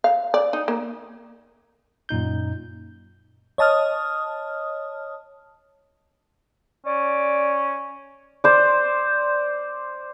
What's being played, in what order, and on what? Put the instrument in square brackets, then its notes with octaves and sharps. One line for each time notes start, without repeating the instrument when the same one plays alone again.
[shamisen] F5
D5
D#4
A#3
[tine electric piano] F#2 A#2 D#4 G6
[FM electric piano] C#5 D#5 A5 D#6 F6
[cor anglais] C#4 [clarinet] D5
[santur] C5 D5